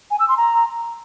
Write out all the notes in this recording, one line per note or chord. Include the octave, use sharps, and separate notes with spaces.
G#5
E6
C6
A#5